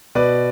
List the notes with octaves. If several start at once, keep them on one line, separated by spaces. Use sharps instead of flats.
B2 B4 D5